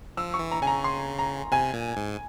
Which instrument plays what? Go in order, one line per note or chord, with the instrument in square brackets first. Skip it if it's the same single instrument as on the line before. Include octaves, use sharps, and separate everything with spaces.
[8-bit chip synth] F3 [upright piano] E6
[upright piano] C#6
[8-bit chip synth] E3
[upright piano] A#5
[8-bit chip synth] C#3 [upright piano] G#5
[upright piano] A#5
C6
A#5
[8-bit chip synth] C3 [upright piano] G#5
[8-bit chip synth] A#2
G#2